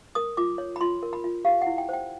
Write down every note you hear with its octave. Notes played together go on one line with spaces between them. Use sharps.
A#4 D#6
F4 D6
C#5
B5
F4 C6
A#4
B5
F4
G4 F5
E4 F#5
G5
C5 G5